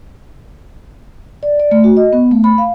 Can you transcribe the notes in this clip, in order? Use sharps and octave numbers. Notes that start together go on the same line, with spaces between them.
D5
D5
A3
F#4
D#5
B3
A3
B5
F5